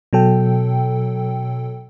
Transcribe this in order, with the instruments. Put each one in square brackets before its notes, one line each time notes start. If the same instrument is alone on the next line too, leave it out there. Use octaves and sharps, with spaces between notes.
[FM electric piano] B2 F#3 A4 G5